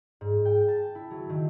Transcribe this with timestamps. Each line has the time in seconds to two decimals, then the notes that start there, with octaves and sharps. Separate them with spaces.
0.21 G#2
0.45 G5
0.68 A5
0.95 E4
1.11 F#3
1.29 D#3